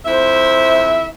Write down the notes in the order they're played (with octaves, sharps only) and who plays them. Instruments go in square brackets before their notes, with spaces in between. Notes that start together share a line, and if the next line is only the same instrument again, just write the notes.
[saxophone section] F2 E4 E5 [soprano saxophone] C5